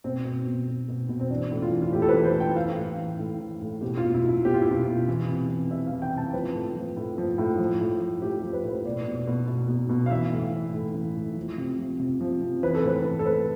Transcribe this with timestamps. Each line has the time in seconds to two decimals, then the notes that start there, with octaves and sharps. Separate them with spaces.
0.04 B2 C4
0.25 B2
0.47 B2
0.68 B2
0.88 B2
1.09 B2
1.20 C4
1.30 E3 D4
1.51 A2
1.62 F4
1.72 E3
1.82 F4
1.92 A2 G4
2.02 A4
2.09 B4
2.14 E3
2.24 C5
2.35 A2
2.40 G5
2.56 E3 F5
2.78 A2
2.98 E3
3.19 A2
3.40 E3
3.61 A2
3.81 B2 G4
3.97 F4
4.03 B2
4.14 E4
4.24 B2 E4
4.45 B2 G4
4.54 F4
4.62 E4
4.66 B2 F4
4.87 B2
5.08 E3
5.29 C3
5.49 E3
5.70 C3 E5
5.87 F5
5.92 E3
6.02 G5
6.13 C3 A5
6.33 F3 B4
6.54 A2
6.76 F3
6.96 A2
7.18 F3
7.38 A2
7.59 F3
7.80 A2
8.01 F3
8.22 A2 G4
8.37 G4
8.44 F3
8.53 B4
8.64 A2
8.70 C5
8.85 B2 D5
9.06 B2
9.27 B2
9.48 B2
9.69 B2
9.89 B2
10.06 F5
10.10 E3 E5
10.32 A2
10.53 E3
10.74 A2
10.95 E3
11.16 A2
11.37 F3
11.58 C3
11.79 F3
12.00 C3
12.21 F3
12.41 C3
12.63 E3 B4
12.75 A4
12.83 A2 B4
13.05 E3
13.19 A4
13.26 A2 B4